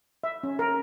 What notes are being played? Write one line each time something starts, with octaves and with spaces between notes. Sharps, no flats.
E5
C#4
A#4